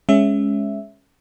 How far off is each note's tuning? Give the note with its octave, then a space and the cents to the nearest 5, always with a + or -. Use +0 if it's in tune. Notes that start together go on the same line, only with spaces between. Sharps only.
G#3 +0 C#4 +0 E5 +0